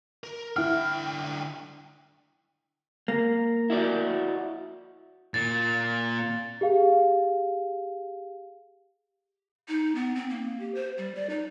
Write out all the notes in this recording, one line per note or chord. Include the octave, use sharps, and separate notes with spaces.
A#4
D3 E4 F#5 G5 F6
A#3
E4 F#4 D5
A#2 A6
G4 G#4 F5
D#4
B3
C4
A#3
G4
C5
G3
D5
D#4